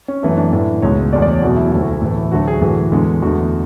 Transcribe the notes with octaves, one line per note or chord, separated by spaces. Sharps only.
C#4
F#2 E3 A3 B3
D4
A2 E3 A3
C#2 B2 G#3 C#5
E2 B2 A3 D5
D5
C#5
E2 B2 F#3 A3 F#4
E4
D2 D3 A3 E4
F#4
E4
A2 E3 A3
D2 D3 F#3 A3 F#4
G#4
A2 E3 A3 F#4
E2 D3 G#3
E2 D3 A3 F#4